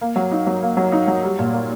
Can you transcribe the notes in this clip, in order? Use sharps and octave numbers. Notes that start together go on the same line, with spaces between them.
A#3
F#3
D#4
F#3
A#3
F#3
D#4
F#3
G3
A#2
A#3